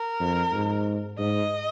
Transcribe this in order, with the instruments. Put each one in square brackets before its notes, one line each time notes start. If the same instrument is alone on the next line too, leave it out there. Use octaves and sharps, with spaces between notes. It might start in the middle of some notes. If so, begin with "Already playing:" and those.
Already playing: [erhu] A#4
[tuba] F2
G#2
[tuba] G#2 [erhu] D#5